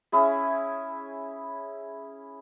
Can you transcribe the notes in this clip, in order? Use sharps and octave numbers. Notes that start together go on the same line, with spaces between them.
C#4 E4 G#4